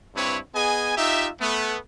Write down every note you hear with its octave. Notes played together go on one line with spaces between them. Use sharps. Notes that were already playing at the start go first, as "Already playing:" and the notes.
G2 C4 E4 B4 C#5
B3 G#4 D#5 G#5
D#4 F4 G4 E5
A3 B3